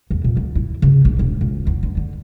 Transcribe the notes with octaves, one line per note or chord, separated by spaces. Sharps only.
E2
A#2
D2
E4
C#3
A#1
E1
C#2
E2
D3
D3